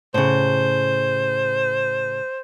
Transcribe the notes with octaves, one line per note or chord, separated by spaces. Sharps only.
A2 C#3 C5